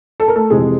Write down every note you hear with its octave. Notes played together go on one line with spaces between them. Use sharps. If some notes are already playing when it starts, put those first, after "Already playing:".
A4
A#4
A3 A4
F2 C3 E3 G#3 G#4